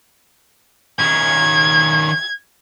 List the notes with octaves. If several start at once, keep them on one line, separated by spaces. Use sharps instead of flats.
D#3 C#4 G#6